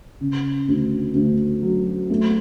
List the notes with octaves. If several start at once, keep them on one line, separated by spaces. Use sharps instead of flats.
C#3
D2
D2
F#3
A3